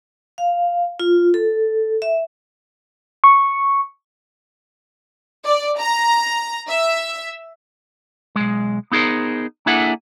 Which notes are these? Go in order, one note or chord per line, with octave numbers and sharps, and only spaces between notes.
F5
F4
A4
E5
C#6
D5
A#5
E5
B1 G#3
B3 D#4 G#4 A#4 C5
A#3 D4 E4 G#4 A4 F#5